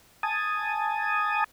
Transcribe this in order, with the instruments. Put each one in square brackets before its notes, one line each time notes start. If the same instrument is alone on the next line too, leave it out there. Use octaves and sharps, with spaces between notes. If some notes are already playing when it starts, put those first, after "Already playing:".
[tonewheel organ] G#5 A5 D#6